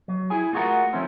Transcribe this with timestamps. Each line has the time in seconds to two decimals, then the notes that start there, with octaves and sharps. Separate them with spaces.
0.08 F#3
0.30 E4 G#4 G#5
0.53 A3 F4 F#4 G#4 A#4 F#5
0.93 D#3 F3 A3 C4 C#4